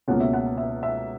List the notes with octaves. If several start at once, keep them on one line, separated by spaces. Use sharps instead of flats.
C#2 B2 A#3 C#4 F#5
E5
F#5
E5
E5